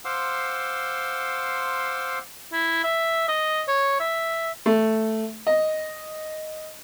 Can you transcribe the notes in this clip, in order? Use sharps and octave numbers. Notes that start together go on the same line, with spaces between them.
C5 F5 F#5 C6 D6 E6
E4
E5
D#5
C#5
E5
A3
D#5